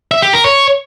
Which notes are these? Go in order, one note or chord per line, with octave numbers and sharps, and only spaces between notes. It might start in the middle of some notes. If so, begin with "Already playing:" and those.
E5
G4
A#4
C#5